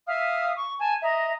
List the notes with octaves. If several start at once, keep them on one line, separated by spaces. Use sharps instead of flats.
E5 F5 D#6 F6
C#6
G#5 A5
D#5 E5 A#5